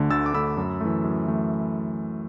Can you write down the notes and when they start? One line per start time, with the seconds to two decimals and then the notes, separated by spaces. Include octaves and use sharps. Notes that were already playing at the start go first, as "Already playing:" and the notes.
Already playing: D2 D3 A3
0.10 D2 E6 A6
0.26 D6
0.34 D3 A3 B5 E6
0.57 F#2
0.81 E3 A3
1.04 F#2
1.27 E3 A3